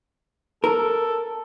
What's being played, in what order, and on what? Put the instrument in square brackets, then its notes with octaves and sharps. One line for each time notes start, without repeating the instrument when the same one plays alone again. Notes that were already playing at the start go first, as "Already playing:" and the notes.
[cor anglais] A4 [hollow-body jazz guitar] A#4